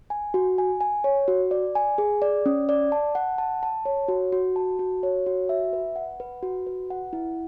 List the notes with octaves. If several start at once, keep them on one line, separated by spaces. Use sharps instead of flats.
G#5
F#4
G#5
G#5
C#5
F#4
D5
G#5
G#4
D5
C#4
D5
A5
F#5
A5
A5
C#5
F#4
F#4
A5
F#4
C#5
F#4
E5
B4
F#5
B4
F#4
B4
F#5
E4